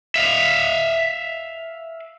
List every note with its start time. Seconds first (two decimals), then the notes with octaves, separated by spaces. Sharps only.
0.16 E5 F5